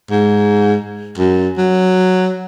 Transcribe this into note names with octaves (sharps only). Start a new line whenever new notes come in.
G#2
F#2
F#3